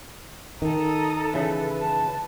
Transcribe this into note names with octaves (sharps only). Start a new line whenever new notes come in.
D#3 A4 A#5 D#6
C#3 E3 B4
A5